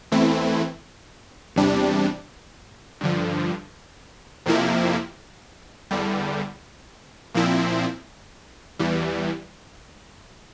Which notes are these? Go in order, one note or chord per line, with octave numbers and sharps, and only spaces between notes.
E2 E3 A3 C4 E4
E2 C3 G3 D4
G2 D3 F3
F2 C3 F3 A#3 E4
E2 D3 G3
A#2 F3 C4 E4
E2 E3 G3